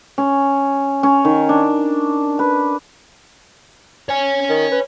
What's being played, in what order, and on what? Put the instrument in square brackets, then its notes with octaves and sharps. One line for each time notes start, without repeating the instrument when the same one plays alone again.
[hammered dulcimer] C#4
C#4
D#3
D4
B4
[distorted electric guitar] C#5 G#5
[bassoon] D#3
B4